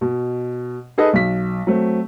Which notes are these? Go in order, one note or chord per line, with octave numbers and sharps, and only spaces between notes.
B2
D#4 G#4 A4 B4 D#5
B1 B6
F#3 A3 C4